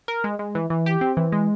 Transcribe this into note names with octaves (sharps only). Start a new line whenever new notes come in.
A#4
G#3
G#3
E3
E3
G4
C4
E3
G#3